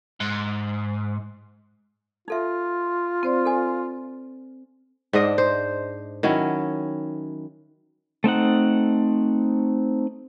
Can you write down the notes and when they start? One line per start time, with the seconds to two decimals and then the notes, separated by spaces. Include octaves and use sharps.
0.20 G#2
2.28 D#4 F4 A4 E5
3.23 C4 C5 D5
3.45 A4 G#5
5.13 G#2 D4 D#5
5.38 C5
6.23 D#3 F#3 C#4 E4
8.24 A3 C4 D#4 F#5